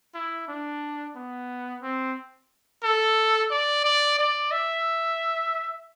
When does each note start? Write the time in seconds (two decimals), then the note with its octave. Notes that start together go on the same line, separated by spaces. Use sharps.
0.14 E4
0.48 D4
1.16 B3
1.82 C4
2.83 A4
3.51 D5
3.84 D5
4.19 D5
4.51 E5